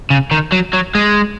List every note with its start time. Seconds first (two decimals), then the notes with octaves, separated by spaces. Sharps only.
0.10 C#3
0.31 D#3
0.52 F#3
0.73 F#3
0.95 G#3